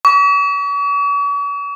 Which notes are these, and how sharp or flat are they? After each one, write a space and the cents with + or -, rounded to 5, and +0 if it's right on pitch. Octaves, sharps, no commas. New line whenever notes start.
C#6 +45